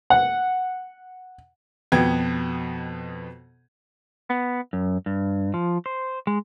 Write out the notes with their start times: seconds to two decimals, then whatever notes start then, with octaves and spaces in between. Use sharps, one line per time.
0.10 F#5
1.92 F2 B2 B3 G5 G#6
4.29 B3
4.73 F#2
5.06 G2
5.54 F3
5.86 C5
6.27 G#3